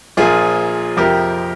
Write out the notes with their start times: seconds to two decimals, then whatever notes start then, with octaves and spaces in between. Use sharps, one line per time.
0.17 A#1 A#2 F3 F4 G#4
0.97 F2 C3 F3 G4 A#4